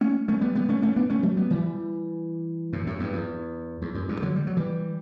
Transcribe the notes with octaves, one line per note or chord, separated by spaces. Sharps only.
A3 C#4
A3 C#4
G3 B3
G3 B3
A3 C#4
A3 C#4
B3 D4
A3 C#4
F#3 A3
G3 B3
E3 G3
F#2 A2
F#2 A2
E2 G2
E2
E2
F#2
E2 G2
D3 F#3
G3
F#3
E3 G3